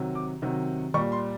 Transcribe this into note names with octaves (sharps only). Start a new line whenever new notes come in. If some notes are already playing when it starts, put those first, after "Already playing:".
Already playing: C3 D#3 F#3
D6
C3 D#3 F#3
A#2 G3 C#6
C6